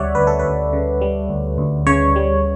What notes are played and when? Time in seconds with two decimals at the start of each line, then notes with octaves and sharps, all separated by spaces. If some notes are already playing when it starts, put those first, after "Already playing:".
Already playing: D2 C#3 G3 C#5 D5 E5 F#5
0.15 D2 B4
0.27 A4
0.39 D2 B4
0.73 C#3
1.01 G3
1.29 D2
1.58 D2
1.87 C#3 C#5
2.16 G3